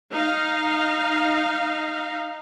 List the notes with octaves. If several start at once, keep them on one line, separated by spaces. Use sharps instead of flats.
D#4 F5